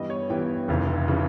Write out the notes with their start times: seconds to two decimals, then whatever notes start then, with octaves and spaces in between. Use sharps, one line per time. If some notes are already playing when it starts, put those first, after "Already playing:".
Already playing: G2 E3 G3 B3 D#5
0.10 C#5
0.30 G2 E3 G3 B3 G5
0.68 F1 F2 C#3 E3
1.08 C#3 E3